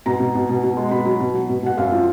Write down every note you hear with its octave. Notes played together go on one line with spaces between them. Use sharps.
B2 A#5
B2
B2
B2
B2
G#3
B2 B5
F#3
B2
F#3
B2
B2 F#5
F#2 F5
F3